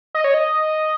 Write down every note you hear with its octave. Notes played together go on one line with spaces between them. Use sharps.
D#5
C#5
D#5